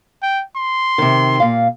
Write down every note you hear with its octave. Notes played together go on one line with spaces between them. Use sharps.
G5
C6
C3 D#3
A#2 F5